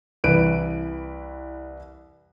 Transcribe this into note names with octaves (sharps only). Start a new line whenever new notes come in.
C2 E3 B4 D7 D#7